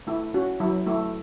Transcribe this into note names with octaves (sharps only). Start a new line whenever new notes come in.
A3 E4
C#4 F#4
F#3 E4
A3 E4